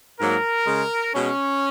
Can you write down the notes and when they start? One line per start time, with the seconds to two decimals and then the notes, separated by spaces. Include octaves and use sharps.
0.19 G#2 F#3 A#3 A#4
0.66 C#3 G#3
1.14 B2 G#3 C#4